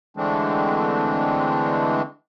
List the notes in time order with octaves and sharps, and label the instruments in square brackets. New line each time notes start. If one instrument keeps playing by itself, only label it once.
[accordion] D3 E3 G#3 A3 C4 D4